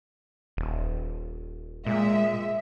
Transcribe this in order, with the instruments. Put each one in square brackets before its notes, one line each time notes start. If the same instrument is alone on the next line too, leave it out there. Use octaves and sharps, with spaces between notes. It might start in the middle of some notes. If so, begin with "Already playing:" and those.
[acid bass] D#1
[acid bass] A#2 [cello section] G#3 E5